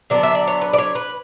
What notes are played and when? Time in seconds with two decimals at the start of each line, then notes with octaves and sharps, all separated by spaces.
0.10 D3 F#3 B3 D4 D5
0.23 E5
0.35 D5
0.47 C#5
0.61 B4
0.73 D5
0.78 C#5
0.95 B4